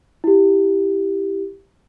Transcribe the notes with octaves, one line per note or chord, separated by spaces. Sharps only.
E4 G4